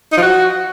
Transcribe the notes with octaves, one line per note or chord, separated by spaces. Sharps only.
D#4
F3
F#4